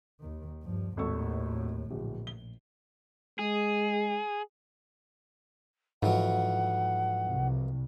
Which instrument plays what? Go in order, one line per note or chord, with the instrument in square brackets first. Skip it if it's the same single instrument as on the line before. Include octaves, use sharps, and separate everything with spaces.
[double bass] D#2 D#3
G2 F3
[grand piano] G#1 A4 C#6 [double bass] D#2 A2
[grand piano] D1 [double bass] A#1
[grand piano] G7
[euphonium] G#3 [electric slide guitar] G#4
[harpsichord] F2 E3 F#3 [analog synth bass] G#2 [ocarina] F#5
[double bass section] C2